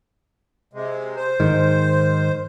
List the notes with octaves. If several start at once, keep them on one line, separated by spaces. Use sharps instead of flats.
C3 G#3
C5
G#2 D#3